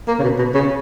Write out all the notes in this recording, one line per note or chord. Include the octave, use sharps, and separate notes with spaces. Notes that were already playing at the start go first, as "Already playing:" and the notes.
A#3
C#3
B2
B2
C#3